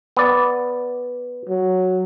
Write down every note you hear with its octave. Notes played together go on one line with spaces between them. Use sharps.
B3 D5
F#3